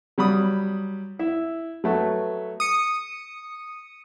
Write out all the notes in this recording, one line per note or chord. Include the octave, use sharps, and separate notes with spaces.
F#3 G3 B5 D#6
E4 E5
F#3 A3 B3
D#6 C#7